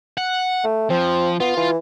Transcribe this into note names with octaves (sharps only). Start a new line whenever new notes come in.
F#5
A3
F3 C4
B3 F4
E3